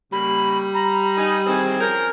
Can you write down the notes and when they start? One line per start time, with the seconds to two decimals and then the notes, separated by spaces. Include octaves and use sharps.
0.12 C#3 G3 A#3 B5
0.74 A#5 B5
1.17 D#4 D#5 G#5 A#5
1.46 D#3 E3 C4 G#4 G#5
1.81 F3 C#4 A#4 G6